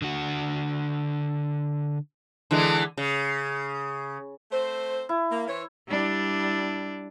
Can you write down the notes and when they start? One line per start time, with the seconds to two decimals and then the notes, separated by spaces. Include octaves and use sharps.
0.02 D3 F#4
2.51 D3 E3 G#3
2.97 C#3
4.52 A3 C4 C5
5.09 E4
5.32 A#3
5.48 E3 C5 C#5
5.88 G3 D4 E4